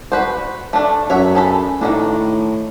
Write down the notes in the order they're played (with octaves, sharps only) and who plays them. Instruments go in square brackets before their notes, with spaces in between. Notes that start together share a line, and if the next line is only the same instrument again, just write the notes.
[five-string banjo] F#4 B4 C5
A3 D4
[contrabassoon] F#2 [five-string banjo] C#5 E5 F#5
[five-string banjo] G#4 A4 B5
[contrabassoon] A2 [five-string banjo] D#3 F3 D4